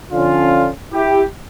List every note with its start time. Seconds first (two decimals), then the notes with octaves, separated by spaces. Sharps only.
0.11 D3 F3 C#4 F4
0.92 E4 G4